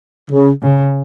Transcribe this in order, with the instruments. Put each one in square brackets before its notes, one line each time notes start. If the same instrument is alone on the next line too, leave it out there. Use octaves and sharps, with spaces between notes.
[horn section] C#3
[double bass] C#3